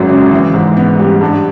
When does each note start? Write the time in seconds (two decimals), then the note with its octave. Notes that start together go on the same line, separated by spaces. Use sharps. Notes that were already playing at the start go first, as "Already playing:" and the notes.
Already playing: G#1 F#2 F#3
0.09 C#3
0.31 E3
0.54 G#2
0.77 B3
0.99 G3
1.21 G2